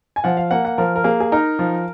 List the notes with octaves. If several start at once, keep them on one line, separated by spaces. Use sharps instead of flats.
G#5
F3 F#5
F5
A#3 F#5
F#5
F3 A#4
A#4
A#3 G#4
G#4
D#4 A#4
F3